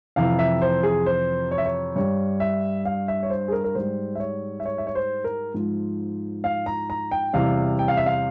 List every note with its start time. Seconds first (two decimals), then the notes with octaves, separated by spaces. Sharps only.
0.16 F2 C3 E3 F5
0.39 E5
0.62 C5
0.83 G#4
1.06 C5
1.51 C#5
1.58 E5
1.65 C#5
1.96 G2 G3 C#5
2.40 E5
2.85 F5
3.08 E5
3.23 C#5
3.30 C5
3.48 G#4
3.52 A#4
3.64 A#4
3.75 G#2 G3 C5
4.15 E5
4.20 C#5
4.60 E5
4.65 C#5
4.78 E5
4.87 C#5
4.95 C5
5.24 A#4
5.54 G#2 F3
6.44 F5
6.66 A#5
6.90 A#5
7.11 G5
7.33 E2 C3 G3 F5
7.79 G5
7.88 F5
7.97 E5
8.06 F5